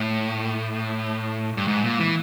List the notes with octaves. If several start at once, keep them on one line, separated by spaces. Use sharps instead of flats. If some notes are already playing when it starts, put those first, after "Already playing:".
Already playing: A2
G2
G#2
A#2
E3